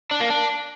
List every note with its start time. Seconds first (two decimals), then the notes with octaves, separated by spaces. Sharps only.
0.11 D4
0.21 A#3
0.30 D4